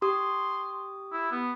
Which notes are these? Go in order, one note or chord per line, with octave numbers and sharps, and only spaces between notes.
G4 C6 D#6
E4
B3